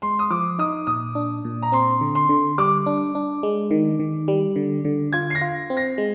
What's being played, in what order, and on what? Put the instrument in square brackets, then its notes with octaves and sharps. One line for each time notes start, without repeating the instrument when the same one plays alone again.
[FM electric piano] G#3 [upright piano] C6
[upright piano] D#6
[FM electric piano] F3 [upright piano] D6
[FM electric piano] D#4 [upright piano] D#6
[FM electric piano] A#2 [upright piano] D#6
[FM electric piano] D4
A#2
[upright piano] A#5
[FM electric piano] C4 [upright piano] C6
[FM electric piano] D3
[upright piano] C6
[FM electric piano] D3
[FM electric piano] G3 [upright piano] D6
[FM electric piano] D4
D4
G#3
D#3
D#3
G3
D3
D3
[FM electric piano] F4 [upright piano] G#6
[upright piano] C7
A#6
[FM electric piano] F4
C4
[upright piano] A#6
[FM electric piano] G#3